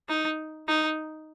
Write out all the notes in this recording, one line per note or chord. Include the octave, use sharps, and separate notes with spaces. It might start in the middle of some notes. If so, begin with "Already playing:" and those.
D#4
D#4